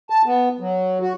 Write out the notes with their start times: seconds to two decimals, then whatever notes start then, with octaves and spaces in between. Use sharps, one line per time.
0.10 A5
0.26 B3
0.60 F#3
1.01 F#4